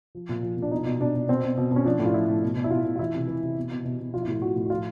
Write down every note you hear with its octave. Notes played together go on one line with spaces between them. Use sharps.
F3
A#2
F3
A#2
D4
B2 D#4
B2
B2 D4
B2
B2 C4
B2
B2
B2
C#4
F3 D4
A2
F4
F3 E4
A2
B2
B2
E4
B2 F4
B2
F4
E3 E4
C3
E3
C3
B2
B2
B2
B2
F3 F4
E4
A2 F4
F3 F#4
A2
F#4
F3 F4